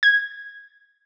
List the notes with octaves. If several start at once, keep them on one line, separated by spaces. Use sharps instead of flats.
G#6